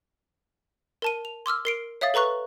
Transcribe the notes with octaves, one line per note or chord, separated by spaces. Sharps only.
A#4 A5 D#7
F7
C6 D6 E6 F6
A#4 C7 D7
C#5 E5 F5 D#6 A6
A4 B4 A#5 C#6 F#6